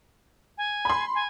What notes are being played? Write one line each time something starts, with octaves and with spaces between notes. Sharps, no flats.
G#5
B5 C6
G#5